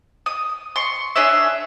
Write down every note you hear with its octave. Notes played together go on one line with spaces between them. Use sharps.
D#6
C6 C#6
D4 G#4 C#5 E5